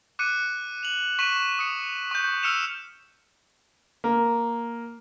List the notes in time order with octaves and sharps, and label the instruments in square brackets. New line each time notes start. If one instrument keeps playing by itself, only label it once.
[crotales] D6 F#6 C#7 D#7
F7 F#7
C#6 B6 D#7 E7 F#7
D#6 C#7
C#6 G6
E6 F6 C#7 E7 F7
[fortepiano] A#3